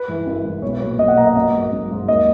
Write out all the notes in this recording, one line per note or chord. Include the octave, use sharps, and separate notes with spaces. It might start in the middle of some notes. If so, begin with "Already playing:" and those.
Already playing: B4
G#2 E3
G#1
G#2 E3
B1 C#5
A#2 F#3 B4
B1 D#5
F#5
A#2 F#3 A#5
D#5
G#1
G#2 F#3
G#1
G#2 F#3
D#2 D#5